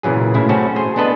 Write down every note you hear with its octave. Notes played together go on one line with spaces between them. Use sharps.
A#2 C#3 E3 F#3 G#4
A2 C#3 E4
A3 C4 C#4 F#4 A4
G#4 C5
B3 D4 A4 B4 D#5